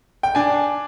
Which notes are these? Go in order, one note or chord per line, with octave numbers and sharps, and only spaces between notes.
G5
D4 G#5